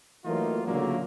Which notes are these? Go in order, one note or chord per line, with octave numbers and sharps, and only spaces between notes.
E3 F#3 A3 A#3 D#4 F4
C#2 A#2 D3 F#3 A3 A#3